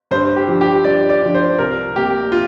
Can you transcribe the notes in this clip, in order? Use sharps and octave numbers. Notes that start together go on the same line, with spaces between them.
G2 C5
G4
F3 D4
G4
G2 D5
D5
F3 D4
C5
C2 A#4
C3 A#3 G4
F4